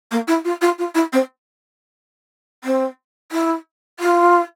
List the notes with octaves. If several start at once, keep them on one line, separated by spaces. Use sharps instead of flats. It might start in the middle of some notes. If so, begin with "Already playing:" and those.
A#3
E4
F4
F4
F4
E4
C4
C4
E4
F4